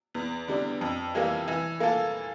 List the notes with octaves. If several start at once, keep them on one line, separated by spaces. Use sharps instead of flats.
E2
D3 G3 D4
F2
E3 G3 A#3
E3
A#3 F4 A4